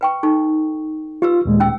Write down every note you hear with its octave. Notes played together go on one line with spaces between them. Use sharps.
B4 G5 C#6
D#4 A4 C#6
F4 G4 B4 E6
D#2 A#2 G#3
C#4 G5 E6